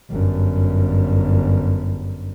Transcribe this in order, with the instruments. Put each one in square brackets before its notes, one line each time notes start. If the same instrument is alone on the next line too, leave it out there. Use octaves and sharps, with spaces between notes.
[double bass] G1 F#2